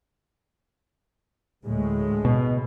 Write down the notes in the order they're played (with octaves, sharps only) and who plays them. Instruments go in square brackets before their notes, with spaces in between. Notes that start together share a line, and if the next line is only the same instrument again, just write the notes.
[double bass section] D2 A2 G#3
[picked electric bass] B2